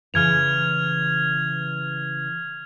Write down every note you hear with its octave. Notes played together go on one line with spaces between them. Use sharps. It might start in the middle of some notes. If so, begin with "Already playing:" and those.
C#3 E3 B4 F6 G#6 F7